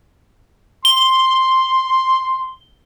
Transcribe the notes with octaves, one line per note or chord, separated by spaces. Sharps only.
C6 G7